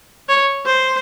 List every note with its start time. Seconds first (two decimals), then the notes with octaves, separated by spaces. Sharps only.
0.28 C#5
0.66 C5